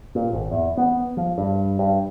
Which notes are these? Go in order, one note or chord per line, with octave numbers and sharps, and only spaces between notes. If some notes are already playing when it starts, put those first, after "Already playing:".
A#2
G#1
E2
B3
F3
G2
G2